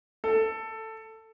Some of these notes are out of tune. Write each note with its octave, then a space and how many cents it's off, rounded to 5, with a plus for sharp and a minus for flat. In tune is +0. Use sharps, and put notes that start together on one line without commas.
A4 +10